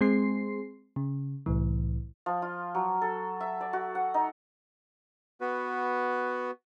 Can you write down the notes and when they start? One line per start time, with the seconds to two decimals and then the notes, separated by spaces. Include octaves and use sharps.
0.01 G#3 C4 G#4 C6 C7
0.96 C#3
1.46 C2 A2 E3
2.26 F3
2.42 F4
2.75 F#3
3.01 A4
3.40 E5
3.61 D5
3.73 F#4
3.95 F#5
4.14 D#4
5.41 B3 F#4 B4